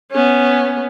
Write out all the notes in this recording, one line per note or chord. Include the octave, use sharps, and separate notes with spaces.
B3 C#4